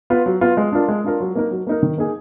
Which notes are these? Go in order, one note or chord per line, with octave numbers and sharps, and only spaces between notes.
B3 F4
F#3
B3 F4
G#3
D4 F4 A#4
G#3
D4 F4 A#4
F#3
A#3 D#4 A#4
F#3
A#3 D#4 A#4
D#3
A#3 D#4 G#4